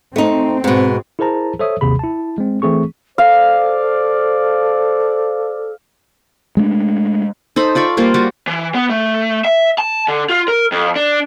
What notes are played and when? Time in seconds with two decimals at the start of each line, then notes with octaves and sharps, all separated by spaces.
0.16 A3 C4 D#4
0.64 G#2 B2
1.19 E4 G#4 A#4 C5 A5 A#5
1.59 A4 C5 C#5 E5 D#6
1.81 G#1 D#2 C3 G#4 B5
1.99 E4 A5
2.38 G#3 C4
2.62 E3 A3 C4 G#4 C#6
3.18 A4 C5 D5 F5
6.57 G#3 A3 B3 D4
7.56 D#4 A4 C5 B5
7.75 F4 D5 B5 C#6
7.97 G3 A#3 F4 C5
8.14 G3 F#4 D6
8.47 E3
8.75 B3
8.90 A3
9.45 E5
9.78 A5
10.08 D3
10.30 F4
10.48 A#4
10.72 F2
10.96 D4